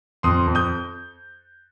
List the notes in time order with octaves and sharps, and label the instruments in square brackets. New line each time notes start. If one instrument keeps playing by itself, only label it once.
[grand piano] F2 C6 D#6
F2
D#6 G6